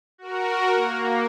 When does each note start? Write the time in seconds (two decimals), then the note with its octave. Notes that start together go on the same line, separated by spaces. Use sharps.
0.18 F#4 A#4
0.75 A#3